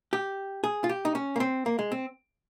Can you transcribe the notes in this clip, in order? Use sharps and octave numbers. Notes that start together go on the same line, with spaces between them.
G4
G#4
F4
G4
D#4
C#4
A#3
C4
A#3
G#3
C4